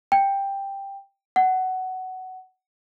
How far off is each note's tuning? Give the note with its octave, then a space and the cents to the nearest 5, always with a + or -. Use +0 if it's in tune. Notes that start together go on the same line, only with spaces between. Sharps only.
G5 +5
F#5 +15